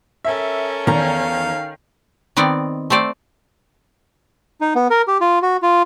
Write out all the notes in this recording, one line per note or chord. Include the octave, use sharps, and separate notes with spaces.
C#4 A4 A#4 E5
E2 D#3 F5 A#5
D#3 B3 C4 D5
A3 C4 C5 D5
D#4
B3
A#4
G4
F4
F#4
F4